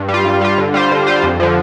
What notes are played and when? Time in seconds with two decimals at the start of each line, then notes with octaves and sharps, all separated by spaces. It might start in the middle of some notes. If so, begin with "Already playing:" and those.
Already playing: G2
0.08 G3
0.14 F4
0.25 G2
0.41 G3 F4
0.58 D3
0.74 G3 F4 C5
0.91 D3
1.07 G3 F4 C5
1.23 F2
1.40 D3 F3